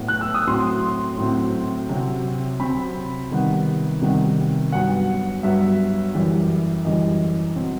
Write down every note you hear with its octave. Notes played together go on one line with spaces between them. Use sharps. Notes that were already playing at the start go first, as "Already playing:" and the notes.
Already playing: A2 F#3 B3
F#6
E6
D#6
A2 F#3 C4 C6
A2 F#3 C4
C3 F#3 C4
C3 F#3 C4 B5
C3 D#3 G3 B3
C3 D#3 G3 B3
G2 F#3 B3 F#5
G2 F#3 B3 E5
F#2 E3 G3
F#2 E3 G3 D#5
B2 F#3 C4